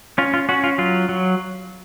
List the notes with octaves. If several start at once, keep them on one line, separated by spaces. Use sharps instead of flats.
C#4 F4
F4
C#4 F#4
F4
F#3 F4
F#3